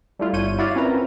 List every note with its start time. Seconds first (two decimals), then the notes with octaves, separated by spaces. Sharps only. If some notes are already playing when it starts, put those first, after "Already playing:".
0.19 G3 A3 E4 F4
0.33 G1 C#5 G6 D#7
0.59 E4 F#4 C#5 D5 F5
0.75 C4 C#4 F4 A#4 B4 A#5